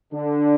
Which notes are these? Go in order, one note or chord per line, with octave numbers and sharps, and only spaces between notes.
D3 D4